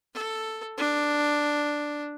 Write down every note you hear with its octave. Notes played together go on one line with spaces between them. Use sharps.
A4
D4